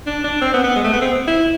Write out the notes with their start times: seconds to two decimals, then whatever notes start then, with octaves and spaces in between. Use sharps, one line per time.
0.07 D4
0.24 D4
0.41 C4
0.53 B3
0.64 B3
0.76 G#3
0.84 A3
0.93 B3
1.01 C4
1.28 E4